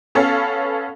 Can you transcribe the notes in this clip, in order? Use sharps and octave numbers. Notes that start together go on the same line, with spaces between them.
B3 C#4 A4 C#5 F5